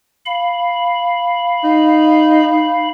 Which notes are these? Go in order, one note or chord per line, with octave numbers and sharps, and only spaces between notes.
F5 B5
D#4